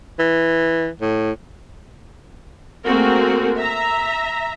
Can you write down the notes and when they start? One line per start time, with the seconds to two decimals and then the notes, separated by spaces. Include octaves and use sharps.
0.19 E3
1.01 A2
2.84 A3 A#3 C4 F#4 G#4 A#4
3.58 E5 A#5